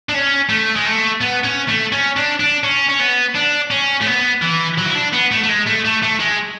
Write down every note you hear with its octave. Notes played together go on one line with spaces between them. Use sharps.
D4
C#4
A3
G#3
A3
B3
C#4
A3
C#4
D4
D4
C#4
C#4
B3
D4
C#4
A3
B3
E3
F#3
E4
D4
B3
A3
A3
G#3
A3
A3
A3
G#3